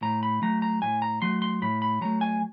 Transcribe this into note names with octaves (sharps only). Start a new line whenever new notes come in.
A2 A#5
B5
F#3 A3 A#5
A#5
A2 G#5
A#5
F#3 A3 C6
C6
A2 B5
B5
F#3 A3 A#5
G#5